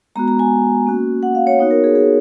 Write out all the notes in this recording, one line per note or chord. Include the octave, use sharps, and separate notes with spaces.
G#3 B3 F#4 A#5
A#5
G#5
A#3 C#4 F#4
F#5
F5
C#5
B3 D#4 F#4 C#5
A#4
G#4
G#4